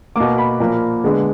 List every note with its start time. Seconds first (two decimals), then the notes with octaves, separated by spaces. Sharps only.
0.16 B2 A#3 D6
0.38 B5
0.60 A#2 F3 A#3
1.04 D3 G#3 B3